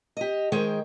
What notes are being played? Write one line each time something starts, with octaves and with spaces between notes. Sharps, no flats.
G4 D#5
D#3 G#3 G#4 C5 G5